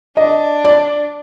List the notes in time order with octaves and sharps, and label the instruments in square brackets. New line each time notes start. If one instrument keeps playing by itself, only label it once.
[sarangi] D4 [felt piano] D#5
[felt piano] D5